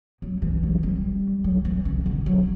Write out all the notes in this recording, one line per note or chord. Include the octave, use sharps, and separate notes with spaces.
F#3
E3
F#3
G3
F#3
E3
C#3
D3
F#3